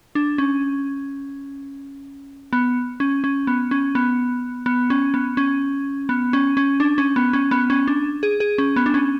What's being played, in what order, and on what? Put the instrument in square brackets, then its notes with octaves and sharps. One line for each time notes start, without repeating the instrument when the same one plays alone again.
[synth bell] D4
C#4
B3
C#4
C#4
B3
C#4
B3
B3
C#4
B3
C#4
B3
C#4
C#4
D4
C#4
B3
C#4
B3
C#4
D4
G#4
G#4
C#4
B3
D4
C#4